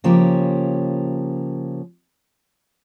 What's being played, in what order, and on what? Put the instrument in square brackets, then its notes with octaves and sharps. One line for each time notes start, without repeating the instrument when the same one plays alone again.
[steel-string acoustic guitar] C#3 F3 A#3 C#4 G4